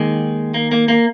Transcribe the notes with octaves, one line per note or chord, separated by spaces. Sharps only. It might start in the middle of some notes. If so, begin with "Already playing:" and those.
Already playing: D#2 D#3 G#3
A#3
A#3
A#3